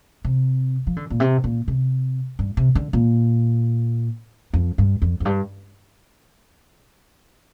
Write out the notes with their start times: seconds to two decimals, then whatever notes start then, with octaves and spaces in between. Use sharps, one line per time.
0.25 C3
0.87 F3
0.96 D3
1.10 A#2
1.20 C3
1.44 A#2
1.68 C3
2.39 G2
2.57 C3
2.75 D3
2.93 A#2
4.54 F2
4.78 G2
5.02 F2
5.20 F2
5.25 G2